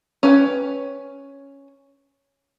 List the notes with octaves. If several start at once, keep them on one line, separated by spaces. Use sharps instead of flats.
C#4 B4 G5